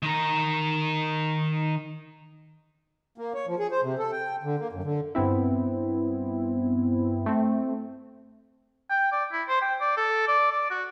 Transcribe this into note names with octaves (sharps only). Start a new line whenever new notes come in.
D#3 A#4
A#3
C#5
F3
G#4
C5
C3
A4
G5
D3
A#3
F#2
D3
G2 B3 C4 E4
A3 C4
G5
D5
E4
C5
G5
D5
A4
D5
D5
F#4